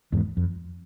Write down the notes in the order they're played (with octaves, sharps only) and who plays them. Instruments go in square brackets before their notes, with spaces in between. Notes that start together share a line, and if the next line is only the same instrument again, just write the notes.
[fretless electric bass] E2 G#2
F2